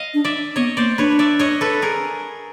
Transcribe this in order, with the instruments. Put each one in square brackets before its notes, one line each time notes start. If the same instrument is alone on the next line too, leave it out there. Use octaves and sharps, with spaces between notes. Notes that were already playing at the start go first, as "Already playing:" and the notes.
Already playing: [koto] D#5 F5
[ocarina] D4
[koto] D5 E5
[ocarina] B3 [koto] C#5 D#5
[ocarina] A#3 [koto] C5 D5
[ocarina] D4 [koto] B4 C#5
[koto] D5 E5
C#5 D#5
A4 B4
G#4 A#4